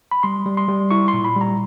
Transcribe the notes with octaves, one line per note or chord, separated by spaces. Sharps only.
B5
G3 C6
G3
C6
G3
E4 C#6
C6
A#2
B5
G3 A#5